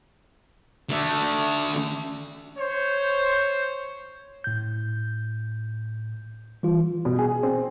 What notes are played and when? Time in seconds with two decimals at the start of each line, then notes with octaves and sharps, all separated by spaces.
0.89 D3 A3
2.57 C5 C#5
4.44 A2 G6
6.63 E3 G3 F4
7.05 B2
7.19 G#4
7.43 C4